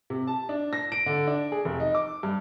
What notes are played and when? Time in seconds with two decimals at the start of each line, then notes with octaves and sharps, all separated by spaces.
0.10 C3
0.27 A5
0.49 D4
0.73 A#6
0.92 D7
1.06 D3
1.27 D4
1.52 G#4
1.65 F1
1.80 D#4
1.95 D6
2.23 G2